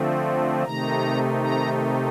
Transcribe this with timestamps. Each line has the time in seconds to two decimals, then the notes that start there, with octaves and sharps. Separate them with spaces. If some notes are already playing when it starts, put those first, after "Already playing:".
Already playing: D3 F3 A3 C4
0.64 C3 D#3 A3 D#4 A#5
1.42 A#5